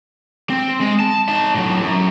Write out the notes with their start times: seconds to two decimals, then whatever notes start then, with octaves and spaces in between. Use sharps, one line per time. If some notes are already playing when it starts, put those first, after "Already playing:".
0.50 C4
0.81 G#3
1.00 A5
1.29 D#4 A5
1.55 A2 F#3
1.82 F#2